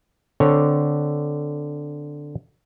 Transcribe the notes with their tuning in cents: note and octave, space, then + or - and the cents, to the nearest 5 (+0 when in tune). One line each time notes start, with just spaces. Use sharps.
D3 +0 C4 -15 C#5 +0